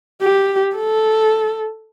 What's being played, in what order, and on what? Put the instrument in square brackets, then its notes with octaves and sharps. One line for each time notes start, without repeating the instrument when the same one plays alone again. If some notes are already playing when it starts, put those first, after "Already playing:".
[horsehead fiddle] G4
A4